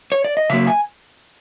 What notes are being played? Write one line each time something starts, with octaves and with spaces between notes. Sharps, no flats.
C#5
D5
D#5
C#3 F#3 A#3 E5
G#5